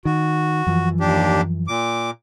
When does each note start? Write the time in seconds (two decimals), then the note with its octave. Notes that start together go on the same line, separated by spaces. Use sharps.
0.05 D#3 F#4
0.67 F#2 E3 F3
1.00 D#2 D4 G4
1.68 A#2 D6